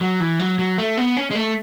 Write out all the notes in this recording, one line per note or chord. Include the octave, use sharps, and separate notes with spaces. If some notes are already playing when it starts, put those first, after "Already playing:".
F#3
E3
F#3
F#3
A3
B3
C#4
G#3
A3